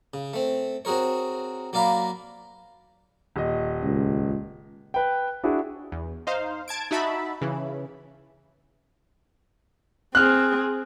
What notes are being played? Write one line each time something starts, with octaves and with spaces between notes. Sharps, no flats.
C#3
A3 C4
C4 F#4 G#4 A#4 C#5
F#3 A#3 D5 F5 A#5 B5
D#1 D#5
C#2
B4 G5
D4 E4 F#4 G#4
E2
D#4 C5 F5
A5 G#6 D7
D#4 F#4 E5 A5 B5
C#3 E3
C4 G#4 F6 F#6